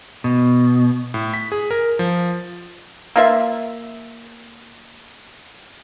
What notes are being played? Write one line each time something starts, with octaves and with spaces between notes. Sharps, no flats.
B2
A2
B6
G#4
A#4
F3
A#3 F4 E5